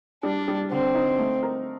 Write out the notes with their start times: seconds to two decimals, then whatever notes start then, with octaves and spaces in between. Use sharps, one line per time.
0.23 G3 D4
0.48 G3
0.71 D3 C4
0.95 D#4
1.18 A3
1.43 A#4